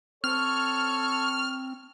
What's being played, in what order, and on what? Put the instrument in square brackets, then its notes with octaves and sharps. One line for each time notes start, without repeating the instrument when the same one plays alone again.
[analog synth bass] C4 [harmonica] A4 C#5 [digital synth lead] F6